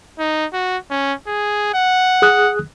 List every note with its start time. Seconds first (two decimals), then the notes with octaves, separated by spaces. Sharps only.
0.19 D#4
0.53 F#4
0.90 C#4
1.27 G#4
1.74 F#5
2.22 G#4 D#6 F#6